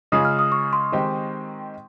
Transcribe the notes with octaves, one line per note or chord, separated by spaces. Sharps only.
C#3 G#3 C#4 F4 G#4 D#6
F6
D#6
C#6
C6
D#3 G#3 C4 D#4 G4